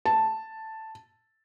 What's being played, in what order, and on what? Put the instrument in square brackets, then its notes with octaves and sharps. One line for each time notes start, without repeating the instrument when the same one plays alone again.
[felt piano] A5